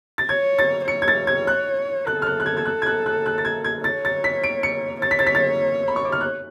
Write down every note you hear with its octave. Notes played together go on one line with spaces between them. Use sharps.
A6
C#5 G#6
A6
C#5 C#7
G#6
A6
G#6
F#6
A4 F#6
F6
F#6
F#6
G#6
G#6
F#6
G#6
F#6
F#6
F#6
A6
G#6
G#6
C#5 A6
A6
B6
D7
C#7
C#5 A6
B6
A6
B6
A6
B5
C#6
D6
F6
F#6